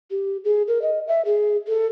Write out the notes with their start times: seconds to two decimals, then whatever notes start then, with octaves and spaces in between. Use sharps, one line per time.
0.11 G4
0.44 G#4
0.68 A#4
0.82 D#5
1.07 E5
1.25 G#4
1.67 A4